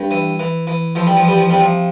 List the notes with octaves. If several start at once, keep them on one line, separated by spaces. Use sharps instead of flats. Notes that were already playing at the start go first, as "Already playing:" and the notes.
Already playing: G2
E3
E3
E3
E3 F3
G3
F3
E3 G3
F3
C3 G3
F3